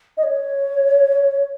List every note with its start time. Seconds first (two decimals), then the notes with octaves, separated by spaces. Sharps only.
0.17 D#5
0.23 C#5